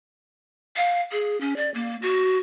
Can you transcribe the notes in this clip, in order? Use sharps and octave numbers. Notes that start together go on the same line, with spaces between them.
F5
G#4
C#4
D5
A#3
F#4